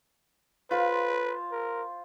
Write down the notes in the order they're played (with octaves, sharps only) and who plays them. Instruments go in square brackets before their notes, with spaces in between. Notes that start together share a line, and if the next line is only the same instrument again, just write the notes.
[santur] F4 C5 [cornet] B4
[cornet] A#4